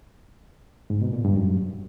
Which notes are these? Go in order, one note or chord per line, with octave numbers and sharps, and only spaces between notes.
G#2
B2
A#2
G2
F#2